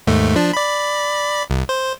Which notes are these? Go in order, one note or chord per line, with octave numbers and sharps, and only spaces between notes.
D#2 G#2 A3
F3 D4
D5 B5
C2
C5